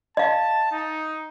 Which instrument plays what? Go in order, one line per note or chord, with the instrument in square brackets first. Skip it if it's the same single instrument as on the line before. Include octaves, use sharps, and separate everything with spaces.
[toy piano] D#5 F5 [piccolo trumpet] A5
[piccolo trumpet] D#4